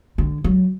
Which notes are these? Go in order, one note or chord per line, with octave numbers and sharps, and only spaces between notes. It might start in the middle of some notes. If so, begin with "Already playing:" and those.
D3
F#3